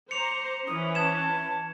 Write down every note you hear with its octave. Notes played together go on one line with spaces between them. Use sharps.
C5 A#5 D6 C#7 F7
E3 C#4 D#6
A5 G#6 E7